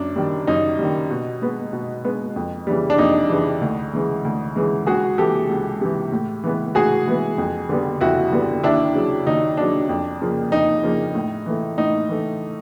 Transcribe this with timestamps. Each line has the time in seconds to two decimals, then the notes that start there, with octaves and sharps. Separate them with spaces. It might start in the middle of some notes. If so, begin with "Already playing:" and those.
Already playing: F#2 D4
0.16 D#3 G3
0.47 F#2 D#4
0.79 D#3 G3
1.10 B2
1.42 G#3 B3
1.73 B2
2.05 G#3 B3
2.36 F2
2.67 C#3 E3 G3
2.90 D4
2.98 F2 D#4
3.30 C#3 E3 G3
3.61 D2
3.93 C#3 E3 G#3
4.25 D2
4.56 C#3 E3 G#3
4.87 C#2 F#4 G#4
5.18 C3 E3 G4 A4
5.50 C#2
5.81 C3 E3
6.12 A2
6.44 E3 G#3 B3
6.75 A2 F#4 G#4
7.07 E3 G#3 B3
7.38 F2
7.69 D3 G3 B3
8.01 F2 E4 F#4
8.32 D3 G3 B3
8.63 D#2 D4 E4
8.95 C#3 F#3
9.27 D#2 D#4
9.57 C#3 F#3 D4
9.89 F2
10.21 C#3 F3 A#3
10.52 F2 D#4
10.83 C#3 F3 A#3
11.15 A2
11.46 E3 A3
11.77 A2 D#4
12.09 E3 A3